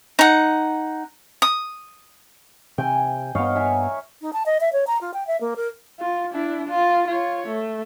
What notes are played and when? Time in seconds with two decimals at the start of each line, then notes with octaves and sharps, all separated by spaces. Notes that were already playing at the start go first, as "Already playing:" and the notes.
0.19 D#4 F#5
1.42 D#6
2.78 C3 G5 G#5
3.35 G2 B3 C#5 D#5 F5
3.55 A#4 E5 G#5
4.22 D#4
4.33 A5
4.46 D#5
4.61 E5
4.73 C#5
4.87 A#5
5.01 F4
5.14 G5
5.27 E5
5.41 A#3
5.56 A#4
5.99 F4
6.31 D4 E4
6.68 F4
7.07 F4 C#5
7.47 A3